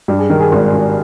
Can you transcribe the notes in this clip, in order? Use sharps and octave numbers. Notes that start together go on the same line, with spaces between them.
G2 G4
G#4
D#3 A#4
G#4
G#1
G#1